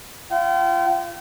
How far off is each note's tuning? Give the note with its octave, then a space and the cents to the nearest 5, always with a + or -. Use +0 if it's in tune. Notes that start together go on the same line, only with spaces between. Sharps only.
F4 -30 G5 -40